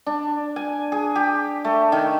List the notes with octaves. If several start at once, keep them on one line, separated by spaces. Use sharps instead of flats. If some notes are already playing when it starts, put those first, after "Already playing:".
D4
G#5
G#4
G4
A3
D#3